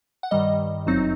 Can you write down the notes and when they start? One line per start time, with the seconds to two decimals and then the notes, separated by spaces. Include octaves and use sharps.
0.23 F#5
0.31 G2 D#3 G3 D#5
0.87 G1 F#2 F#3 C4 D#4